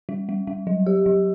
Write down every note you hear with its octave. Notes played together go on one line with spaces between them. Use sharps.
G3
G3
G3
F#3
G4
F#3